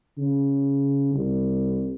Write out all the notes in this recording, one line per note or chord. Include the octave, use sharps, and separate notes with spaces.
C#3
C2